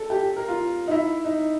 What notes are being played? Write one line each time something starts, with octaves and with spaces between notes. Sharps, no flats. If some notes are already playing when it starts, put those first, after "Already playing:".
Already playing: A4
G4
A#4
F4
D#4
E4
D#4